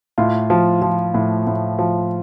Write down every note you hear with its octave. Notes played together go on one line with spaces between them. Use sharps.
A2 F4
F3
F3
A2
A2
F3